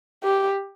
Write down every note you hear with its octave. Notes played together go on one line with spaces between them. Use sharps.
G4